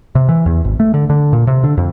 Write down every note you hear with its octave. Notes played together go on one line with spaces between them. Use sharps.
C3
E3
E2
G#1
A3
D3
D3
A#2
C3
D3
F2